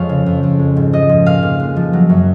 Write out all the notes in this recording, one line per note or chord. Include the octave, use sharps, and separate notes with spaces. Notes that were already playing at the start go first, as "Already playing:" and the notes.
Already playing: F2 F3 G#3 C#5 F5
C#3
F2
F2
G#3
G#2
F3 D#5
G#2
A#2 F5
A#2
G#3
F3
F#3
F#2